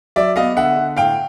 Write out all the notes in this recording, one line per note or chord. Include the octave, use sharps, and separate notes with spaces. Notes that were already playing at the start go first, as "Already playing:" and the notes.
F#3 D5 E5
B3 D#5 F5
D3 E5 F#5
D3
A2 F5 G5